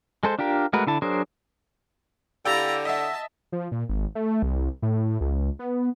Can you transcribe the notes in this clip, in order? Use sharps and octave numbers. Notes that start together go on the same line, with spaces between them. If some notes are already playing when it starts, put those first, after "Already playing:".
G#3 A4 C5
D4 F4 G4 A#4
G#3 A3 F#4 A#4 B4
D3 E4 A5
F#3 D4 G#4 A#4 C5
D3 E4 G4 F5 G5 A#5 E6 A6
D#5 E5 F#5 A5 E6 B6
F3
A#2
G#1
A3
C2
A2
C#2
B3